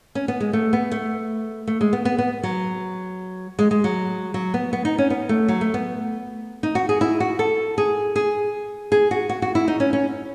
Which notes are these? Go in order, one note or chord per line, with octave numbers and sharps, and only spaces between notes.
C#4
B3
G#3
A3
B3
A3
A3
G#3
B3
B3
B3
F#3
G#3
G#3
F#3
F#3
B3
B3
D#4
C#4
B3
A3
F#3
A3
B3
D#4
F#4
G#4
E4
F#4
A4
G#4
G#4
G#4
F#4
F#4
F#4
E4
D#4
C#4
C#4